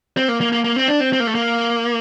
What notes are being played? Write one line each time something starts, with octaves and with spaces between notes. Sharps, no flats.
C4
A#3
A#3
A#3
A#3
C4
D4
C4
C4
A#3
A3
A#3